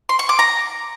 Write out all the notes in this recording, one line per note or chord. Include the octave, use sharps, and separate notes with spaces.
C6
C#6
D6
A#5